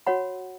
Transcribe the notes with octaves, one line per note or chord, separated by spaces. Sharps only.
F#4 C#5 F#5 B5